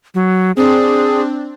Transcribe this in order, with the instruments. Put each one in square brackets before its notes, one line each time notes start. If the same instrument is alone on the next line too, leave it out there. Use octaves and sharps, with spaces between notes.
[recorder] F#3
[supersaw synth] C4 D4 [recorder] G#4